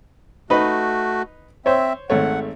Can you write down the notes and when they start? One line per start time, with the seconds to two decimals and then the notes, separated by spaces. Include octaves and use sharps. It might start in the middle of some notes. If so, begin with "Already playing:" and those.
0.50 A3 D#4 F#4 B4 B5
1.66 C4 C5 C#5 E5
2.10 G#1 A3 C#5 F#5